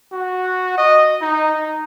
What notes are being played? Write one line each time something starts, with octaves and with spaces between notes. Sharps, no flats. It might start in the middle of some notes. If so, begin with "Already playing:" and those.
F#4
D#5
D#4